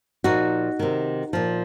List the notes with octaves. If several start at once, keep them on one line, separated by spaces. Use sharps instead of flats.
A#2 F3 D#4 F#4
C3 D#3
A#2 F3